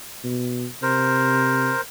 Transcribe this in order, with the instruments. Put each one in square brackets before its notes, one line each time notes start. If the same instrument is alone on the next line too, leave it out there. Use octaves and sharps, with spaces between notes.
[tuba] B2
[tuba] C3 [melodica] A#4 C5